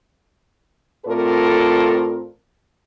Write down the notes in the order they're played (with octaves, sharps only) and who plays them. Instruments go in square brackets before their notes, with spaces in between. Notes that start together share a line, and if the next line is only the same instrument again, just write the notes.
[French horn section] A2 C4 F4 A4 A#4 D5